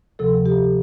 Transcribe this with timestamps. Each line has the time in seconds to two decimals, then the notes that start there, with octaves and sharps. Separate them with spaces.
0.19 D2 C3 F3 A4
0.46 G4